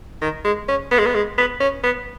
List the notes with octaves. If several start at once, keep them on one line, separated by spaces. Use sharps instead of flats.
D#3
G#3
C#4
B3
G#3
B3
G#3
B3
C#4
B3